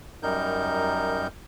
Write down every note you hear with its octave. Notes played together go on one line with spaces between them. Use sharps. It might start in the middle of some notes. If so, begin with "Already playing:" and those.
F#2 G3 D#4 A#4 G6